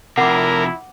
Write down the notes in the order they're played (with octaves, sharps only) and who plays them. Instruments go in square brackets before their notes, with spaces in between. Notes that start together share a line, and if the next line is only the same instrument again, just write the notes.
[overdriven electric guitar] C3 F3 [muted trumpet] E4 [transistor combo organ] A#4 [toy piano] F#5 D6